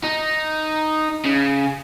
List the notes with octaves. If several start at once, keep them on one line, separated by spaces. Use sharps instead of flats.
D#4
C#3